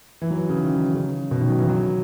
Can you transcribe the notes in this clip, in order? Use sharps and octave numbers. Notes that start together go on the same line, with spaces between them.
E3
F#3
C#3
D#3
C#3
B2
D#3
F#3
E3
F#3